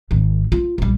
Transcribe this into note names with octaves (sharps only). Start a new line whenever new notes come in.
G#1 D#3
F4
A#1 G3